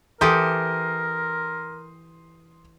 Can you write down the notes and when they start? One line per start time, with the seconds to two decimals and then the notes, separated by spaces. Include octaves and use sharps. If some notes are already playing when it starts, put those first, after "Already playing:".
0.21 E3 G4 A4 A#4 C6 D#6 G6